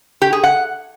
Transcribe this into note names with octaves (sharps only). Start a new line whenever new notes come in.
G4
G#4
F#5